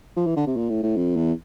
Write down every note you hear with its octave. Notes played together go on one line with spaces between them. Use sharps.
F3
E3
D3
C3
A#2
A2
A2
F2
E2